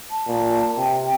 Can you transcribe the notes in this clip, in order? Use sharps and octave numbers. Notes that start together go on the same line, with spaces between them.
A5
A#2
C3 G5